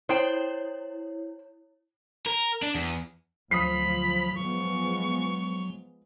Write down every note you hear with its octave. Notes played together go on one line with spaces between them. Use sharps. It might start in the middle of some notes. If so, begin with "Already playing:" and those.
E4 C5 C#5 G5
A#4
D4
E2
D2 F3 F#3 B5 D#6 B6 C7
F3 G#3 B3 C#6